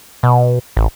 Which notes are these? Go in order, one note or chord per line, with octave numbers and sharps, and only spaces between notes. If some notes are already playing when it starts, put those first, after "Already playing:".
B2
A1